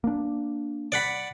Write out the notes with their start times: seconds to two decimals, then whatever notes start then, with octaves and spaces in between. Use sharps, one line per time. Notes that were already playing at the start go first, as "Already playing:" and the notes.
0.04 A#3 D4
0.92 D5 F#5 B5